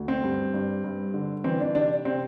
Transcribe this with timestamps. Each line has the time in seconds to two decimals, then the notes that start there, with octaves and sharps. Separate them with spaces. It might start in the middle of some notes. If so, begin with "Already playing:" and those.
Already playing: D2
0.08 C4
0.23 G2
0.54 G2
0.84 G2
1.14 D3
1.44 E3 C4
1.60 D4
1.75 C3 D4
2.05 C3 C4